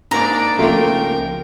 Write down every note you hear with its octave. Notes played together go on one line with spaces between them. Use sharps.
G#2 A#3 D4 D5 A#5 D6
C#2 C#3 F3 A3 A#3 F4 A#4 G5